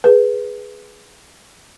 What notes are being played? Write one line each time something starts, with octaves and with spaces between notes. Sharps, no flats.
G#4 B4